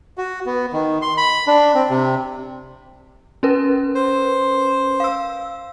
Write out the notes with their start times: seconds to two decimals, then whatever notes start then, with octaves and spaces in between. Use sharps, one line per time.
0.18 F#4
0.46 B3
0.73 D#3
1.02 C6
1.17 B5
1.47 D4
1.74 C4
1.90 C3
3.43 C#4 A#4 B4
3.95 C5
5.00 F5 E6